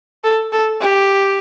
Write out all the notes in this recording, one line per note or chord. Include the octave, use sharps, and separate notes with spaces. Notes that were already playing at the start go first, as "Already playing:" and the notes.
A4
A4
G4